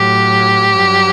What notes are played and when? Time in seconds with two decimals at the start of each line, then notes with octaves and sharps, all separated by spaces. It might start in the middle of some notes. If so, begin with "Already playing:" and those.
Already playing: A2 F#3 G4
0.75 G2 F#3